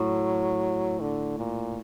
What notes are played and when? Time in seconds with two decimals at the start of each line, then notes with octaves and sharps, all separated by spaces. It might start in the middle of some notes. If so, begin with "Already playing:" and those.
Already playing: A2 F#3
1.01 D3
1.38 A#2